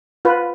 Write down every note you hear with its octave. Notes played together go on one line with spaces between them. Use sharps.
F4 B4